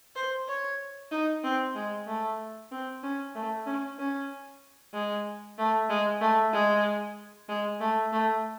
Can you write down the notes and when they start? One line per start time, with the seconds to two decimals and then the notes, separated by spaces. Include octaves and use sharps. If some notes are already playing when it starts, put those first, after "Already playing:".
0.16 C5
0.48 C#5
1.12 D#4
1.44 C4
1.75 G#3
2.07 A3
2.71 C4
3.03 C#4
3.35 A3
3.66 C#4
3.99 C#4
4.94 G#3
5.58 A3
5.90 G#3
6.21 A3
6.53 G#3
7.49 G#3
7.80 A3
8.12 A3